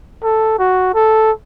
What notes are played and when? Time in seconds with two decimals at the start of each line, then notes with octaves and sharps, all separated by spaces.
0.24 A4
0.59 F#4
0.94 A4